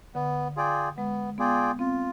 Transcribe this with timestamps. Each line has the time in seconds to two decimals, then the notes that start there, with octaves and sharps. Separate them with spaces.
0.15 D3 B3
0.56 F4 G#4 D5 G5
0.97 G#3 B3
1.38 B3 F4 G#4 D5 G5
1.79 C4 F4